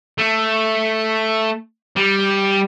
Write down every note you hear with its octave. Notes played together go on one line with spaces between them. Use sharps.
A3
G3